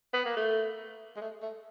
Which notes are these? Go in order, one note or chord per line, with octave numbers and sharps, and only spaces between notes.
B3
A#3
A3
G#3
A3
A3